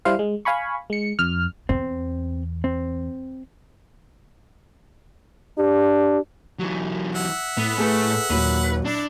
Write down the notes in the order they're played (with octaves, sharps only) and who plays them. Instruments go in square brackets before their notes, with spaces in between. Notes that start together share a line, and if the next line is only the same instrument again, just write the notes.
[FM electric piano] G3 E4 C5 F5
G#3
F5 G#5 B5 C#6
G#3 C#7
F2 F6
[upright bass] E2 [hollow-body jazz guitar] C4
[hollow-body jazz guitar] C4
[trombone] D4 [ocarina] G4
[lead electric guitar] E3 F#3
[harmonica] E5 F#5
[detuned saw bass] A2 [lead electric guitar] B3
[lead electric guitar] A3 [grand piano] G#4 A4 B4
[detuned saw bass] D#2 [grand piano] A#2 F#3 [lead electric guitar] B4
[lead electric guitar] D4 [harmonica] E4